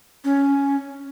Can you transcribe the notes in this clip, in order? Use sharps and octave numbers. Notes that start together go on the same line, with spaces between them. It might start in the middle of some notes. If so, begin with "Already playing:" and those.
C#4